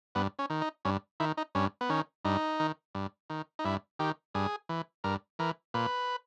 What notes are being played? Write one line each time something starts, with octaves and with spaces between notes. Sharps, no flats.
G2 B3
C#4
D#3
D#4
G2 C#4
D#3 E4
D#4
G2 C#4
B3
D#3 C#4
G2 D#4
D#3
G2
D#3
D#4
G2 E4
D#3 G4
G2 G#4
E3
G2 A#4
E3 A#4
A#2 B4